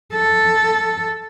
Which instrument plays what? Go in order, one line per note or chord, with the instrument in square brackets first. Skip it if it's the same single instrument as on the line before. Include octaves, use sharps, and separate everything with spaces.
[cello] A4